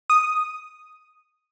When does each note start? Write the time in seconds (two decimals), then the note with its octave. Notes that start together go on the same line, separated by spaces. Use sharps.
0.10 D#6